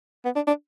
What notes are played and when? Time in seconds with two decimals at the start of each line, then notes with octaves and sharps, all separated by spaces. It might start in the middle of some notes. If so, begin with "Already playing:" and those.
0.25 B3
0.36 D4
0.47 D4